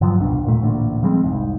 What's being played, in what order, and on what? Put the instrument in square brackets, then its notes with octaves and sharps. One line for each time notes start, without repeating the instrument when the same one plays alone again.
[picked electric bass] G2 D3 F3 F#3
D#1 C2 B2 D4
D#2 A#2 A3
A1 D2 A#2 D3
F3 G3 G#3 C4
F1 C2 G#2